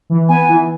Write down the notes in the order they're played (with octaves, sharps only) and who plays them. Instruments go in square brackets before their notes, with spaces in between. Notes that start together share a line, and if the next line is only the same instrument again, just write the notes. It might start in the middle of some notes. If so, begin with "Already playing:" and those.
[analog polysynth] E3
[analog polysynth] B3 [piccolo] G#5
[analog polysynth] E3